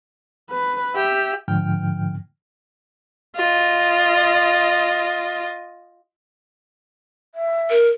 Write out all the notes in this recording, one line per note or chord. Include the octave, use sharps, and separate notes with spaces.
B4
G4 E5
G#2 D3 F3 G5 F6
F4 D#5
E5
A#4